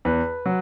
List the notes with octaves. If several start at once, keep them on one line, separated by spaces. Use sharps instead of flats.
E2 B4
F#3